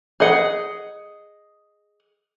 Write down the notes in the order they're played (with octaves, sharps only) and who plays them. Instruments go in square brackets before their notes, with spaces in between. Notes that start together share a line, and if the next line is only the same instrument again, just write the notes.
[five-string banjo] G#4 D#5 F#5